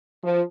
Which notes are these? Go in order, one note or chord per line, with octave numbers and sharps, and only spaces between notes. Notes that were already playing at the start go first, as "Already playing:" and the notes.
F3